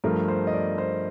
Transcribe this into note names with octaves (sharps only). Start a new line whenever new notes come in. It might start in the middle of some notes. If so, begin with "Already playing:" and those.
G2 F3 A3 A#4
C5
D#5
D5
C5